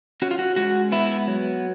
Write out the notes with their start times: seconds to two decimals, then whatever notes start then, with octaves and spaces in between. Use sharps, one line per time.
0.22 C#4 F#4
0.31 F4
0.39 F#4
0.56 G#3 F#4
0.92 B3 E4
1.27 F#3